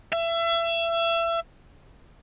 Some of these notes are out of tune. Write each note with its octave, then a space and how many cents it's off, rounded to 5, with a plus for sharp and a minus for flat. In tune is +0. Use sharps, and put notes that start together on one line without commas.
E5 +30